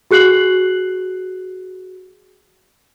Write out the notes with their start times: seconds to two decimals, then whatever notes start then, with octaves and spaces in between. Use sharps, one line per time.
0.11 F#4 G#4 F#6 C7 F#7